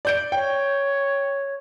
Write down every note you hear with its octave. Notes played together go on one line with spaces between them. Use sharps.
D5 G6 D7
C#5 G5